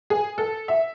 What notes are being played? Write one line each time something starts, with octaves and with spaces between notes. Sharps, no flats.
G#4
A4
E5